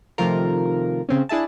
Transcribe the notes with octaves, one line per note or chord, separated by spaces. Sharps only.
C3 D#3 F3 A3 F4 A#4
C#3 C4 C#4
D4 E4 G#4 E5 A5